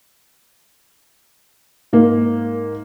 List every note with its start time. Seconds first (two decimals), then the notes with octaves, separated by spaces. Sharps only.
1.93 G#2 A#3